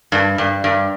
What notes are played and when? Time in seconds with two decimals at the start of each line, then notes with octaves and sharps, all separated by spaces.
0.12 G2
0.38 G2
0.64 G2